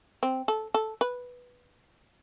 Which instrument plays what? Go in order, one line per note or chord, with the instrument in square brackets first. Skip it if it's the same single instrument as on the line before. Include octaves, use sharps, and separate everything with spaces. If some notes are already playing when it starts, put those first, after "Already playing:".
[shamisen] C4
A4
A4
B4